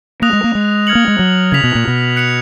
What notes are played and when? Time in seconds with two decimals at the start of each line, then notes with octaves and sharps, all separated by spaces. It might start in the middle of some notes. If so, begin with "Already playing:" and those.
0.22 A#3 D#6 F#6 A#6 F7
0.33 G#3
0.44 A#3
0.55 G#3
0.87 F6 G#6 C#7 F#7
0.95 A#3
1.08 G#3
1.19 F#3
1.52 C#3 G#6 B6 F7
1.64 B2
1.75 A#2
1.87 B2
2.16 F#6 C#7 F7